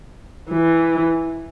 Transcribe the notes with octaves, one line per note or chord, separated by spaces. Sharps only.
E3